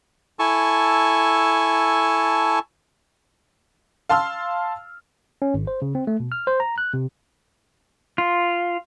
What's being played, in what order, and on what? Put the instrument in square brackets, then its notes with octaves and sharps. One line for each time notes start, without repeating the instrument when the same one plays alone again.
[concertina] E4 A4 G#5 A5 C#6
[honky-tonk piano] F5 A5 C6 E6 F6
[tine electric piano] C#4
G#1
C5
C#3
C4
A3
B2
F6
C5
A#5
F#6
C3
[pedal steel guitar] F4